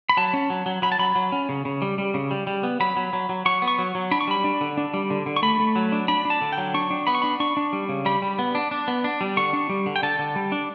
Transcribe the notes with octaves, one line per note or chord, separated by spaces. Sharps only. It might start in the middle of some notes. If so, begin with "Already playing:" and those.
B5
F#3 A5
C#4
F#3
F#3
F#3 B5
A5
F#3 B5
F#3
C#4
C#3
C#3
G3
G3
C#3
G3
G3
B3
F#3 B5
F#3
F#3
F#3
F#3 C#6
B3
C#6
F#3
F#3
D4 B5
C#6
G3 B5
D4
D3
D4
G3
D3
D3
C#6
A3 B5
A3
F#3
D4
D4 B5
D4
A5
D3
G5
F#3
D4 C#6
D4
B3 B5
C#6
D4 B5
D4 C#6
D4
G3
C#3
G3 B5
G3
B3
D4
D4
B3
D4
G3
D3 C#6
D4
G3
D3
G5
D3 A5
D3
G3
D4